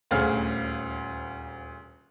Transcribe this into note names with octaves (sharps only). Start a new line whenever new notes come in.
D#1 D2 C#4 G#4 F5 F6